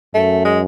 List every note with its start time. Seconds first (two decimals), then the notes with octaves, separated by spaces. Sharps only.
0.14 F#2 A3
0.45 G#3